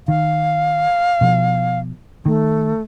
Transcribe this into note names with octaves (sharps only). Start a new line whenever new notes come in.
D#3 F5
B2 F3
D#3 A3